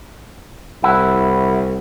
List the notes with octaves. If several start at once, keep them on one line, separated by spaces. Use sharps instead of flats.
C2 E4 F#5